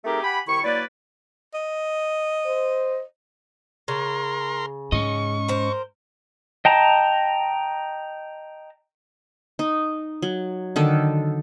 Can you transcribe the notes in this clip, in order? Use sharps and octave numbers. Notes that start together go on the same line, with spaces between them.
A3 C4 D#4 G4 G#4 A#4
G4 F#5 G#5 B5
C2 D#3 E4 C#6
F#3 A#3 E4 B4 D5
D#5
C5
C#3 A#4 C6
G#2 C#4 D#5 C#6
A#4 C5
D#5 G5 A5 A#5
D#4
F#3
D3 D#3 A4